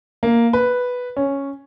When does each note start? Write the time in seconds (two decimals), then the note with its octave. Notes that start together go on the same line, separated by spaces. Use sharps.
0.23 A#3
0.53 B4
1.17 C#4